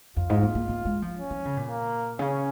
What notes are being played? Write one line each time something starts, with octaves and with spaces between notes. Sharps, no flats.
F2 F4
G#2
A#3
A#3
A#3
G#3
F3
C#4
F3
C#3
A#2
A#3
C#3 C#4